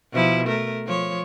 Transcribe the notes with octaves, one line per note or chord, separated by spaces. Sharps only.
B2 F3 E4
A3 A#4
F3 C#5